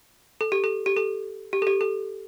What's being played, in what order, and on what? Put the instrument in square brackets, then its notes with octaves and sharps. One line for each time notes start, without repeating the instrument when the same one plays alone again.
[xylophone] A4
G4
A4
G4
A4
G4
A4
G4
A4